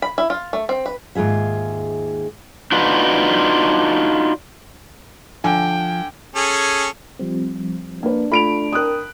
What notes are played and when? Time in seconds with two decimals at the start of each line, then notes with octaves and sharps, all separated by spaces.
0.02 B5
0.18 E4
0.30 F4
0.53 A3
0.69 C4
0.86 B4
1.15 D#2 G#2 F4 G#4 E5
2.72 D4 D#4 F4 F#4 B4
5.44 D3 F3 G5 G#5
6.36 C#4 G#4 A4
7.19 F3 G3 C4
8.03 A#3 D4 B4
8.32 A3 F4 B5 D7 F7
8.73 A#4 G5 A5 D#6 F#6